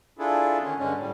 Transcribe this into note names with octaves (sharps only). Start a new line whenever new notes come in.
D4 E4 F4 G#4 A4
D3 D#3 C#4
G2 D3 G#3 C#4
A2 G3